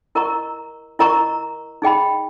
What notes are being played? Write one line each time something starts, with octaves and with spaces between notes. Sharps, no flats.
E4 A#4 D#5 A#5 C#6
E4 A#4 D#5 A#5 C#6
D#4 G#4 D#5 G5 B5